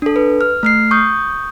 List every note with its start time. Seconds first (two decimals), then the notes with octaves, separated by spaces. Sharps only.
0.02 D4 A4
0.16 B4
0.41 F6
0.63 A3 F6 C7
0.91 C#6 D#6 G6